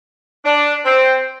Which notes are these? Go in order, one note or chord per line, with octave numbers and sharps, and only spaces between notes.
D4
C4